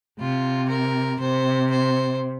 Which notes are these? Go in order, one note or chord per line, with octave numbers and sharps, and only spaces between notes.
C3 F4
A#4
C3 C5
C5